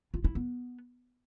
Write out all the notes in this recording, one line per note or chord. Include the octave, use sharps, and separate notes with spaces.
F4
E4
B3